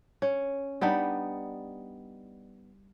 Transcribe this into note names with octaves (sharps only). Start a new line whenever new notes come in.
C#4
G3 B3 D4 D#4